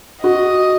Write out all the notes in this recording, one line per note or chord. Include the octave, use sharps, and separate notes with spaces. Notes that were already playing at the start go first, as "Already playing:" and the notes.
F#4 D#5